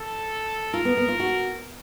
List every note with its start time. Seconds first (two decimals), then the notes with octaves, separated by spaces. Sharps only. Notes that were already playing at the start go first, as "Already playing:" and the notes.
Already playing: A4
0.73 F4 A#4
0.85 B3
0.97 B3
1.08 F4
1.20 F#4